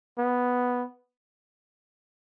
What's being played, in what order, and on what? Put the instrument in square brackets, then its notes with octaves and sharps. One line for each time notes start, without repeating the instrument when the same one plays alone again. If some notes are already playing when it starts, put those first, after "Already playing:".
[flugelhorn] B3